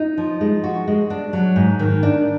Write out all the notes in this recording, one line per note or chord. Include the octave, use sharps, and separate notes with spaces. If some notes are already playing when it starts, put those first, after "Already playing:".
Already playing: D#4
F3
G#3
F#4
G#3
D4
F#3
G#2
D#3
D4